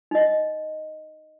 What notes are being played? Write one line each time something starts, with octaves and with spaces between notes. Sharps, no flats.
D#4 D#5